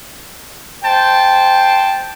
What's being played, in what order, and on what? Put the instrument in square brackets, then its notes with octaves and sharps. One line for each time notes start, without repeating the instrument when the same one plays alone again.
[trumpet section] C5 G5 A5